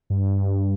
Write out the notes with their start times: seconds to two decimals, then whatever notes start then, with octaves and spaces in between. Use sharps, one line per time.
0.10 G2